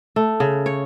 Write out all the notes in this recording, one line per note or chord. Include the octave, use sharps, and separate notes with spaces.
A3
C#3
C#5